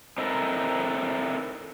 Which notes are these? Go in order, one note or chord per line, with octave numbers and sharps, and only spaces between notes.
C4 D#4 E4 A4 A#4